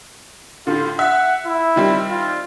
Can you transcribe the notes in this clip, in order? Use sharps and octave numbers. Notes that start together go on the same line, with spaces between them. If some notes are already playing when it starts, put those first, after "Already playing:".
A2 D3 F4
E5 F#5
E4
D#3 G3 C4
F4